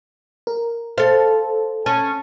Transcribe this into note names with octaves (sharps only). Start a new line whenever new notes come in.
A#4
A4 C5 F5
C#4 A5